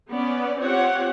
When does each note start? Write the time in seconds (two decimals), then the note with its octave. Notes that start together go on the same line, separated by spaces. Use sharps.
0.11 B3 C#4 D5
0.63 C4 F4 G4 C#5 F#5